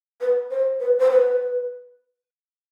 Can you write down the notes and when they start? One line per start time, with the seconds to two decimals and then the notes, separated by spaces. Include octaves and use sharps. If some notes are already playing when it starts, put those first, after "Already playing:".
0.21 B4
0.51 C5
0.80 B4
0.99 C5
1.11 B4